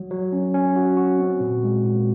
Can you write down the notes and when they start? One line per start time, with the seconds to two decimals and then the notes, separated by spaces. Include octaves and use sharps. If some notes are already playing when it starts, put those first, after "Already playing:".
Already playing: F#3
0.11 F#3
0.32 C#4
0.54 C#4
0.76 F#4
0.97 F#4
1.19 C4
1.40 A#2
1.63 G#3
1.84 A#2